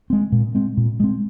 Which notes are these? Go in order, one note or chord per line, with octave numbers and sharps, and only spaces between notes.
G#3 C4
A#2
G#3 C4
A#2
G#3 C4